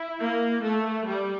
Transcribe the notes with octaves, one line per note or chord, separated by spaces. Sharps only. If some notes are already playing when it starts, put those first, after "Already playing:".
Already playing: E4
A#3
A3
G3